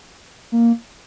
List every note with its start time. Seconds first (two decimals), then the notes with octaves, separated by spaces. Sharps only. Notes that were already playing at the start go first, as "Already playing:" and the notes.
0.52 A#3